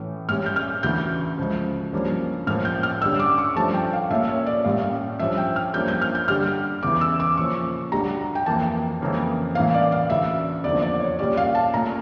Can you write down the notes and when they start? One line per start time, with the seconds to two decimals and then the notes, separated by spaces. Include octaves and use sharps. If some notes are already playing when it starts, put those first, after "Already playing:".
Already playing: A2 E3 A3 C#4
0.29 A2 G3 C#4 F6
0.46 G6
0.56 F6
0.83 D2 C#3 E3 G6
1.38 C#2 C#3 F3
1.93 G2 F3 A#3 C#4
2.47 A2 F3 A#3 C#4 F6
2.65 G6
2.83 F6
3.01 G2 D3 G3 C#4 E6
3.20 D6
3.38 C#6
3.56 G2 F3 A3 C#4 A5
3.74 G5
3.93 F5
4.10 A#2 A3 C#4 E5
4.29 C#5
4.46 D5
4.64 A2 G3 A#3 C#4 F5
5.19 G2 F3 C#4 E5
5.38 G5
5.56 F6
5.73 G2 F3 A#3 C#4 G6
5.88 G6
6.02 F6
6.15 G6
6.28 G2 D3 G3 F6
6.83 E2 C#3 E3 D6
7.01 E6
7.20 D6
7.37 A#2 F3 C#4 C#6
7.92 D2 D3 G3 A#5
8.35 G5
8.46 F2 E3 A#3 A5
9.01 F2 C#3 E3 A#3 C#4
9.55 A2 E3 A#3 C#4 F5
9.74 D5
9.92 F5
10.10 D2 C#3 E3 E5
10.64 E2 D3 F3 A#3 D5
10.82 D5
11.00 C#5
11.19 A#2 G3 C#4 D5
11.37 F5
11.55 A5
11.73 A#2 A3 C#4 A#5